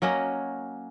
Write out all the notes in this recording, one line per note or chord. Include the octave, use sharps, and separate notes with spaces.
F#3 A#3 C#4 D#5